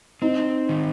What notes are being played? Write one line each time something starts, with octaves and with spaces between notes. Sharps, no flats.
C4 D#4
D#3